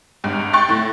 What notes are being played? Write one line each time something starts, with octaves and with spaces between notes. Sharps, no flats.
G#1 G2
G5 C6 C#6 F#6 A6
A2